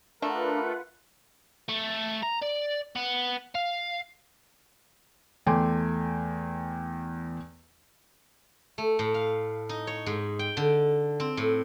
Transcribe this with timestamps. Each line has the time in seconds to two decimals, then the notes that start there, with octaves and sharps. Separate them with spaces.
0.22 A3 D4 F4 A#4 B4 F#5
1.69 A3
2.23 A#5
2.42 D5
2.96 B3
3.55 F5
5.46 E2 A3 G5 G#5 C6 D6
8.78 A3
8.99 A2
9.14 F5
9.69 D#4
9.87 C#5
10.06 G#2
10.39 G5
10.57 D3
11.20 C4
11.37 A2